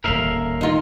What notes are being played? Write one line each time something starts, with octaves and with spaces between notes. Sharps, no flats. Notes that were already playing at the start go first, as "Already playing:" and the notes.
D#1 A2 A#4 E5 F5
D#4 F4